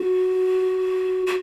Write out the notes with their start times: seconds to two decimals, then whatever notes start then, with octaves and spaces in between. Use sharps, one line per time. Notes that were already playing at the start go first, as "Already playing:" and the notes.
Already playing: F#4
1.27 F#4